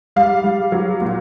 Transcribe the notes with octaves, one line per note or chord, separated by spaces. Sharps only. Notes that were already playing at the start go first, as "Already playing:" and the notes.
G3 F5
G3
F#3
A#2